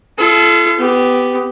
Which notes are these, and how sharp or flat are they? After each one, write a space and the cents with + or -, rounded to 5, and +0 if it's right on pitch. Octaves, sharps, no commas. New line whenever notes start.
F4 -40 A4 -25
B3 +20 G4 +0